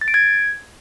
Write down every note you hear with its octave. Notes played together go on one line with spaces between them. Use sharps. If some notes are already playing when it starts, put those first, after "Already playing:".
A6
D7
G#6